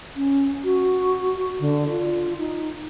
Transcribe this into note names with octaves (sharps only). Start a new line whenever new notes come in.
C#4
F#4
D3
F4
D#4